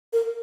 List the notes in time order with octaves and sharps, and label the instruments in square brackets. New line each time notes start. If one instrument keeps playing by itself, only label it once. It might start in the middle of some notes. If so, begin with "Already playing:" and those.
[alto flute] A#4